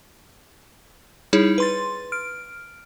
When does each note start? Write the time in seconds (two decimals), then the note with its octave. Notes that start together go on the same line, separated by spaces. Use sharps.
1.33 G3 D#4 E4 G#4 C#5
1.58 B4 C6 A6
2.12 F6 D7